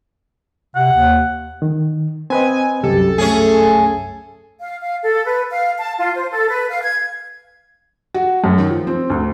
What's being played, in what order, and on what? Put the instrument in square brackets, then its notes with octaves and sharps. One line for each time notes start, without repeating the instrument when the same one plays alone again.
[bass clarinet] C3 [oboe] F#5
[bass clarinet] D#2
[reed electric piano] D#3
[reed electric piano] C4 B4 D#5 [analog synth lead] G#5
[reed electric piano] C2 F#2 [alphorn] G4 [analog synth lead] A4
[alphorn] A3 [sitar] C#4 G#4
[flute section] F5
F5
A4
B4
F5
A5
F4
C5
A4
B4
F5
G#6
[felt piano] F#4
F#2
D#3
F3
C4
D2